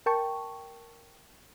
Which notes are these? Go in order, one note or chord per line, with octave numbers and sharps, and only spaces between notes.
A#4 G5 A5 C#6